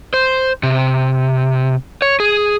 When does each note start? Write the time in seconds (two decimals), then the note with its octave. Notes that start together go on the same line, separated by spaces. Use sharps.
0.14 C5
0.63 C3
2.02 C#5
2.20 G#4